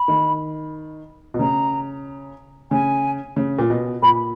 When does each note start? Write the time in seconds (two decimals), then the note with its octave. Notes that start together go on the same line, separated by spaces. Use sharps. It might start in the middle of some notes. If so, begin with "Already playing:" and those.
Already playing: B5
0.08 D#3
1.34 B2
1.39 C#3 A#5
2.71 C#3 G#5
3.36 C#3
3.59 A#2
3.70 B2
4.02 A#2 B5